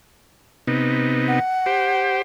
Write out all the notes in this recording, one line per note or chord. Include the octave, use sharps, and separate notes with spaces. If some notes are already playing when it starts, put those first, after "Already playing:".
C3 B3 D#4
F#5
G4 C5